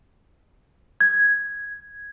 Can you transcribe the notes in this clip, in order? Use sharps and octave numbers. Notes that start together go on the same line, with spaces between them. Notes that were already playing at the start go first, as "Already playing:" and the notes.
G#6